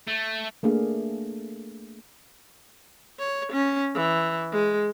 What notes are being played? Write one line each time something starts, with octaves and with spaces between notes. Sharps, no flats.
A3
A3 A#3 D4 G#4 F5
C#5
C#4
E3
G#3